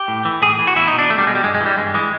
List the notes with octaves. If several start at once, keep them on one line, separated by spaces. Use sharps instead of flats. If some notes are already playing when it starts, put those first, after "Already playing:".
Already playing: G4
A2
E3
A2 G#4
E3
F#4
E2 E4
D#4
B2
D4
E2 A3
G3
B2 G#3
G3
G2 G#3
G#3
E3
G3
G2 G#3
E3 G#3